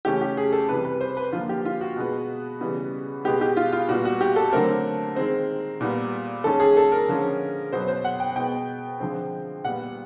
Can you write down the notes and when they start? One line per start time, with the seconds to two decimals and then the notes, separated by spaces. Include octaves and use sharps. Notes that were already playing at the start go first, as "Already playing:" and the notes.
0.05 C#3 E3 A3 C#4 G4
0.21 G4
0.37 G#4
0.52 A4
0.68 C3 E3 G3 B4
0.85 B4
1.01 C5
1.17 B4
1.32 D3 F3 A#3 F4
1.49 G4
1.65 F4
1.81 F#4
1.96 B2 G#3 B3
2.61 C#3 E3 G3 B3
3.24 B2 G#3 B3 G4
3.41 G4
3.57 F4
3.73 F4
3.88 A#2 G3 B3 F#4
4.05 F#4
4.21 G4
4.36 A4
4.53 D3 F#3 A3 C4 A#4
5.16 D#3 G#3 C4
5.81 A#2 G3 B3
6.44 D#3 G#3 C#4 A4
6.60 G#4
6.77 A4
6.92 A#4
7.09 D3 F3 G#3 C#4
7.72 B2 F#3 B3 C5
7.88 C5
8.04 F#5
8.20 G5
8.36 B2 G#3 B3 G5
9.00 D3 F3 G#3 C4
9.64 A#2 G3 B3 F#5